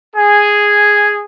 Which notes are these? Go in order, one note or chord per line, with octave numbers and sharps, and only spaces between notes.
G#4